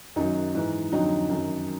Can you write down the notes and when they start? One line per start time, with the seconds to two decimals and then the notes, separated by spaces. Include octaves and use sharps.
0.16 F#2 D#3 F#3 D#4
0.55 G#2 E3
0.92 F2 D3 F#3 D#4
1.29 F#2 D#3 F#3